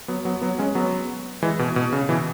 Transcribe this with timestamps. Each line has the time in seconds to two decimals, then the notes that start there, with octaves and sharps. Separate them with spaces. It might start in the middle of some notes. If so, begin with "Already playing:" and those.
0.08 F#3 B3
0.25 F#3 B3
0.42 F#3 B3
0.59 G#3 C#4
0.75 F#3 B3
1.43 E3 G#3
1.59 B2
1.76 B2
1.93 C#3
2.09 B2 E3